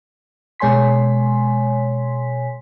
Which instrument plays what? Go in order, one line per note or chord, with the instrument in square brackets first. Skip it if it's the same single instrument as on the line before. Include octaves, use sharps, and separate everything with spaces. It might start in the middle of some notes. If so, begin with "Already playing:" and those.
[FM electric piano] B2 G#3 C#5 G#5 C6 B6